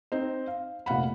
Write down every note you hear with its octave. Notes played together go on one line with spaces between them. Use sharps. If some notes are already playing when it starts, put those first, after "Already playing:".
C4 D#4 C5
F5
F1 A#2 F5 F#5 B5